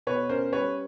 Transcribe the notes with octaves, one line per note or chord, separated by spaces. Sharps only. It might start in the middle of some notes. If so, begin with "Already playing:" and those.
B2 B4 C#5
C#4 A#4 C5
G3 B4 C#5